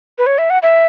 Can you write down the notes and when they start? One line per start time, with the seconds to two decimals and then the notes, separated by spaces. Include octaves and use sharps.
0.18 B4
0.27 C#5
0.38 E5
0.50 F#5
0.63 E5